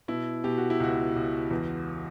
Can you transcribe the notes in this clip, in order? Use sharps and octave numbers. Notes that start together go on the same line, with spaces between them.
B2 E4
B2 G4
F#4
E4
C#2 F#4
C#2
E2